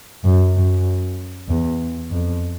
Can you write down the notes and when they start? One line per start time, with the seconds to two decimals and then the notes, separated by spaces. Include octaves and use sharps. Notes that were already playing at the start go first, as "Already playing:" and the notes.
0.24 F#2
0.55 F#2
1.48 E2
2.11 F2